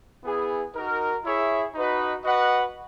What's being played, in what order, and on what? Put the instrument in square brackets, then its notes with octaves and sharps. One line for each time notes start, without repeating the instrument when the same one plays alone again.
[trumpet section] B3 E4 G#4 B4
D#4 F#4 A#4
E4 G#4 C#5 E5
D#4 F#4 B4 D#5
F#4 B4 D#5 F#5